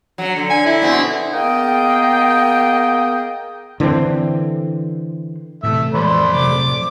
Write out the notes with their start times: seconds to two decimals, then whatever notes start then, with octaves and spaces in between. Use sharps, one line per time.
0.18 F#3 C#4
0.36 D3
0.50 G#5
0.66 E4
0.82 B2 D3 C4
1.34 A#3 B3 G#4 D#5 G5
3.80 D3 E3 B3 C4
5.63 A2 C3 E3 A3 E5
5.94 F2 A2 E3 G#3 C5 D5 B5
6.35 C3 F#3 D6